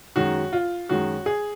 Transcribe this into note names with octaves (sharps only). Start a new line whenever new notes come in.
F#2 D#3 G#3 F#4
F4
F#2 D#3 G#3 F#4
G#4